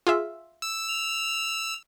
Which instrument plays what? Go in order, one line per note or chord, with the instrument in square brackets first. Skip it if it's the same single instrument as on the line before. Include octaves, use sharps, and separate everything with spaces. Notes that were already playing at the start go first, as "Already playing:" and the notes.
[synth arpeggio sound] F4 G#4 E5
[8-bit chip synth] E6
[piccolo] F7